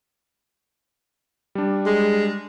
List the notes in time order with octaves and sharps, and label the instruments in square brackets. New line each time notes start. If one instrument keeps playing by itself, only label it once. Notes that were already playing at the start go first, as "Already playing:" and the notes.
[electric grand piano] G3 D4
[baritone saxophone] G#3